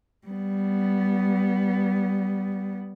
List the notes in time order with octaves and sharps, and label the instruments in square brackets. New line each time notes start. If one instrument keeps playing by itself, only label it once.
[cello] G3 B3